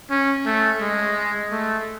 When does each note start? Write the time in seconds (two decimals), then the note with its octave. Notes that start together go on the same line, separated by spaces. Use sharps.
0.10 C#4
0.46 A3
0.81 G#3
1.52 A3